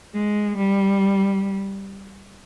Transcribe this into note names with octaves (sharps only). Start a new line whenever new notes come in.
G#3
G3